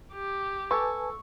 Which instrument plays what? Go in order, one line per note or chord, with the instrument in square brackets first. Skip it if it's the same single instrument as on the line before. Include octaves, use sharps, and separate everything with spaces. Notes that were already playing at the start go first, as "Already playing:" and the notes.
[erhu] G4
[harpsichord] A4 [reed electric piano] B4 G#5 A5 [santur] C#6